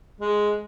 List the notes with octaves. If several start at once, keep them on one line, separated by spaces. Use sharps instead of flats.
G#3